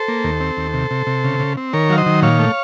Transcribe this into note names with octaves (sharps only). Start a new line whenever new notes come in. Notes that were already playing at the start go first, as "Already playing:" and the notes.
Already playing: A4 C5
A#3
D#2
C4
D#2
C3
C3
C3
C#3
C#3
C4
D#3 A#4 C#5
F#3 F5
C5 D#5
D#3
A#2 C#5 F5
A3